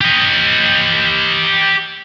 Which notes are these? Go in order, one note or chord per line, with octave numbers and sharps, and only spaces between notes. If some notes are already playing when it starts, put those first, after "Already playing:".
G4 D#5